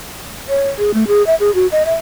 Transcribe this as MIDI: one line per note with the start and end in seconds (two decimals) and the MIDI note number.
0.49 0.68 73
0.78 0.94 68
0.94 1.07 57
1.08 1.25 68
1.27 1.35 76
1.40 1.53 68
1.55 1.67 66
1.72 1.83 75
1.86 1.95 76